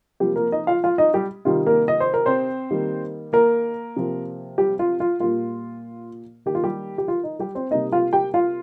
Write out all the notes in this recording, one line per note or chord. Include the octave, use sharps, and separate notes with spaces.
C3 F3 G3 A#3 G4
A#3 A#4
D#4 D#5
F4 F5
F4 F5
D#4 D#5
G3 G4
C3 D#3 G3 F4
A#3 A#4
D#5
C5
A#4
C4 C5
D#3 G3 A#3
A#3 A#4
C3 F3 A#3
G3 G4
F4
F4
A#2 G3 A#3 F4
D#3 A#3 G4
F4
G3 G4
G4
F4
D#4
G3 G4
C4 C5
C3 G3 A#3 D#4 D#5
F4 F5
G4 G5
F4 F5